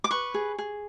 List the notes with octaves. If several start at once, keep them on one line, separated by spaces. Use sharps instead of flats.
D6
B4 C#6
G#4
G#4